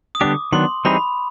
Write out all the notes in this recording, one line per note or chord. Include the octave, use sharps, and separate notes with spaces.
D#6
D3 G3 B3 D4 G4 D6
D#3 F#3 B3 D4 C6
E3 G3 C4 D#4 G#4 B5